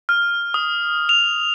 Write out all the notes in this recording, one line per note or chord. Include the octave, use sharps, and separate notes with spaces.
F6
D#6
F7